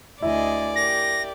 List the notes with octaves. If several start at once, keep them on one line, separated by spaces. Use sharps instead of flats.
D2 E4 D5 D#5 G#5
G4 A#4 A#6